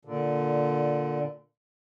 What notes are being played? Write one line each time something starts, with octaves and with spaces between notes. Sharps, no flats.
A#2 D3